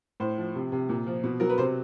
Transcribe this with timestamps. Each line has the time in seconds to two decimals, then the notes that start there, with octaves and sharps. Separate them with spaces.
0.20 A2 C5
0.38 F3
0.55 C3
0.72 C3
0.89 A#2
1.07 F3
1.24 B2
1.40 F#3 A#4
1.49 B4
1.58 C3 C5